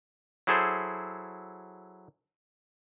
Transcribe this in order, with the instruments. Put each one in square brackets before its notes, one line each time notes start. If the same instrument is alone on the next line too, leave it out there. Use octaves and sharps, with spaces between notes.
[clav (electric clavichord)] F#3 E4 G#4 A4 C5